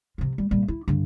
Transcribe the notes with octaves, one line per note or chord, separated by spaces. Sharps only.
C3 F3
G3
A#2 G3
E4
G2 D3